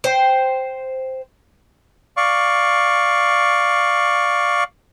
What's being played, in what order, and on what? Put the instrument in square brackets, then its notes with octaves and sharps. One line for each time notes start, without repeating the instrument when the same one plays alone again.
[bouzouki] C5 G5
[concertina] D5 F5 C#6